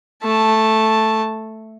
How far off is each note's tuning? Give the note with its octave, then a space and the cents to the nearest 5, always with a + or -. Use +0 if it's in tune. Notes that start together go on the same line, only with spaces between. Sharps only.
A3 +0 A5 +0